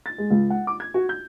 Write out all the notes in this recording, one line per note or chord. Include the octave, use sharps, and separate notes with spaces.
A6
G#3
C#2
F#5
D6
G#6
F#4
G6